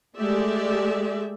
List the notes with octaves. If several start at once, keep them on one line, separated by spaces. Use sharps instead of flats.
G#3 A3 G4 G#4 D5 E5